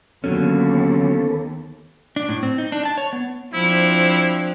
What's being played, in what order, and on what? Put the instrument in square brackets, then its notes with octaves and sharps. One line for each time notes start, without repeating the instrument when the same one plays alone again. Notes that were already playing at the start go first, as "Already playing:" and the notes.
[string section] D#2 [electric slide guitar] D3 F#3 C#4 [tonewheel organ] B3 A4
[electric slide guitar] D4
A2
C4
D#4
D4
A5
C#5
B3
[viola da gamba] F3 C4 D4 [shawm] E4